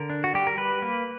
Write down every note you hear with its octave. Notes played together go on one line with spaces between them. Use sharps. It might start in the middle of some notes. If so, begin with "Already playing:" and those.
Already playing: D3 A#4
D4
F#4
G3 G4
A#4
G3 B4
A#3